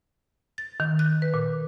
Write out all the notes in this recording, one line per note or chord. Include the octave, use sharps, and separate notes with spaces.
A6
D#3
F#6
B4
A#2